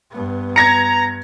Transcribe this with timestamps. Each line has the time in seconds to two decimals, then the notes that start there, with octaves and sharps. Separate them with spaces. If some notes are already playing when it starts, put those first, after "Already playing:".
0.11 G2 B3
0.56 A#5 G#6 A#6 C#7